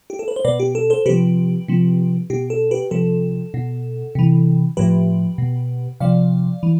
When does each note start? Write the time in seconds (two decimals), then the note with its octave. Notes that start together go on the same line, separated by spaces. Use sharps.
0.10 G4
0.19 A4
0.28 B4
0.36 C5
0.45 B2 B4 D5
0.60 G4
0.75 A4
0.90 A4 C5
1.06 C3 F3 G4 B4
1.68 C3 F3
2.30 B2 G4
2.50 A4
2.71 G4 B4
2.91 C3 F3 A4
3.54 B2
4.15 C3 E3
4.77 A2 F3 G4 B4
5.38 B2
6.00 C3 F3 D5 F5
6.63 E3